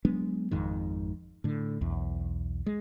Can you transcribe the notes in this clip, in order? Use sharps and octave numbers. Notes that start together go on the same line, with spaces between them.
F#3 G#3 B3 D4
G#1 F2 G#2 D#3
A2 D3
B1 E2
G#3